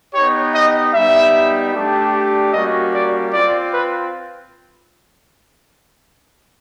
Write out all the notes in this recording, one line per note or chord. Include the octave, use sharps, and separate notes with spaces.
B3 D#4 G4 C#5
D#5
G3 B3 D#4 G4 E5
A3 D4 G4
G3 A#3 C#4 F#4 D#5
D5
C4 F4 D5
B4